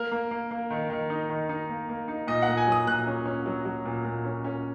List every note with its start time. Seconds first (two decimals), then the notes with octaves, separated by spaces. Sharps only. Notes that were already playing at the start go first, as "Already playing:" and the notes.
Already playing: A#3 A#4
0.11 A#3
0.31 A#3
0.51 A#3
0.70 D#3
0.90 D#3
1.10 D#4
1.29 D#3
1.49 D#4
1.69 A#3
1.89 A#3
2.08 D#4
2.27 A#2 D#5
2.42 F#5
2.48 A#2
2.57 G#5
2.67 F#3 D#6
2.87 A#2 F#6
3.07 C#4
3.26 C#4
3.46 F#3
3.65 F#3
3.85 A#2
4.04 A#2
4.24 C#4
4.45 C#4